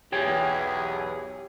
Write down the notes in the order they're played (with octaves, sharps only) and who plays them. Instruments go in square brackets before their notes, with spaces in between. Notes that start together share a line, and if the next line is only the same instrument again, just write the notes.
[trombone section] B1 E2 G#4 [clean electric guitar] G4 C#5 G5